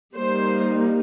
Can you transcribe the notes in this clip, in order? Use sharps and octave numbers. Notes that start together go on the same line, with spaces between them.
G3 A#3 D#4 C5